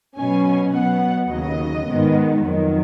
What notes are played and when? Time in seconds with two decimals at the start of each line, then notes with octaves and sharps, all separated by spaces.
0.17 B2 F#3 C#4 G#5
0.73 B2 F#3 B3 F#5
1.30 D#2 C#3 F#3 D#5
1.86 G#2 D#3 G#3 B3
2.42 F2 D#3 F#3